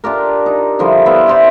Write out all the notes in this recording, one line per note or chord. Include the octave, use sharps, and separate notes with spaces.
D4 F4 G4 A#4
D#4
D3 F3 G3 E4
B3 E4 F4 E5
E4 A#4 C5 D5